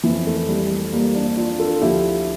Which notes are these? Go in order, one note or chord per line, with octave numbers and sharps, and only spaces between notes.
F2 E3
A3
G3
A3
G3 A#3
A#3 D4
D4 F4
F4 A4
D2 D3 F3 E4 G4